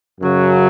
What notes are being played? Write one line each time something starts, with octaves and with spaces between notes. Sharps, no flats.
F#2 C#3 F#3